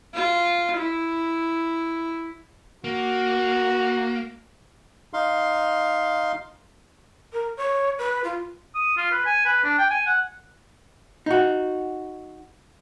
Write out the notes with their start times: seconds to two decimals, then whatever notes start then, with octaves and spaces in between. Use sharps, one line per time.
0.14 F4
0.77 E4
2.84 A#3 F#4
5.13 D#4 F5 C6
7.33 A#4
7.57 C#5
7.99 B4
8.24 F4
8.75 D#6
8.97 F4
9.12 B4
9.26 G#5
9.45 B4
9.64 D4
9.78 G5
9.90 G#5
10.07 F#5
11.26 D#4 F#4